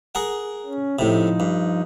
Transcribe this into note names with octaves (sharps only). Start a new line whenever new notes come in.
G#4 A#4 F#5
C#4
A2 C3 F3 D#4
G2